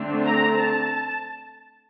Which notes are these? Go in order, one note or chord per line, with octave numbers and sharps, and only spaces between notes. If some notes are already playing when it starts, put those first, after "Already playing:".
Already playing: D3 A3 C4
A#5
A5